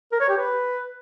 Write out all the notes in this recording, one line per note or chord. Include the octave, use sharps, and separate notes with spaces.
A#4
C#5
G4
B4